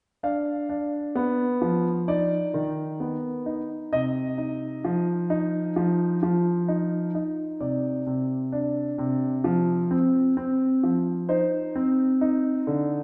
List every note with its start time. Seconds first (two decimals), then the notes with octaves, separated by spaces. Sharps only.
0.23 D4 F5
0.69 D4
1.15 B3
1.62 F3
2.08 D#4 D5
2.54 D#3
3.00 B3
3.46 D#4
3.93 C3 D#5
4.38 D#4
4.84 F3
5.30 D#4
5.76 F3
6.23 F3
6.68 D#4
7.15 D#4
7.60 C3 D5
8.06 C3
8.52 D4
8.98 C3
9.44 F3
9.91 C4
10.37 C4
10.83 F3
11.29 D#4 C5
11.75 C4
12.21 D#4
12.67 D3